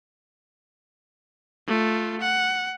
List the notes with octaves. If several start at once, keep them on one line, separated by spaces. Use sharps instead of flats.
A3 F4
F#5